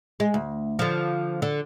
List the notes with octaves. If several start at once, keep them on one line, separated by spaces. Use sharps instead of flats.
G#3
D2
D3 F3
D3